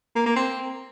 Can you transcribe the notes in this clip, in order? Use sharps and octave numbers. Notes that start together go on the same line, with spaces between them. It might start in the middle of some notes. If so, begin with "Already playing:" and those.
A#3
A#3
C4